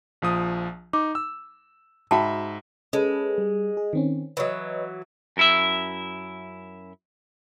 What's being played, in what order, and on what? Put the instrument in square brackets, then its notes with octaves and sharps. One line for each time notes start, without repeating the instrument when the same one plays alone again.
[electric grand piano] A#1 F3 D#6
[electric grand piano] D#4 [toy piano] D6
[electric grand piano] E6
[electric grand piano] G#2 E5 B5 [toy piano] F#4 G5 A5
[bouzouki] G#3 [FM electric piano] C#4 A4 B4
[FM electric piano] G3
G#4
D#3 C4 C#4
[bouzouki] E3 F#3 [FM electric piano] B4 C#5 D#5
[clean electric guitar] F#2 E4 E5